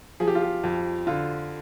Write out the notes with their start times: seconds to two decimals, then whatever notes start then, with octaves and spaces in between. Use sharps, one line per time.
0.20 F3 G#4
0.27 G4
0.35 F4
0.43 G4
0.63 F2
1.07 D3 F4